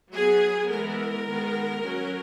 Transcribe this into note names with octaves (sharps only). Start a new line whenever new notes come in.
F#3 B3 G#4
E3 G#3 B3 A#4
D#3 G#3 B3
F#3 C#4